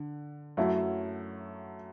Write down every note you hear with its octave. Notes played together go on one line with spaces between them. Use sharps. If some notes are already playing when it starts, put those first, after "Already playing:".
Already playing: D3
F#2 F#3 A3 E4